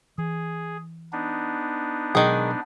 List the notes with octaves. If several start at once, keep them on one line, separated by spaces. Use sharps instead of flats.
E3 G#4
B3 D4 D#4
B2 D#3 F#3 G#3 G#4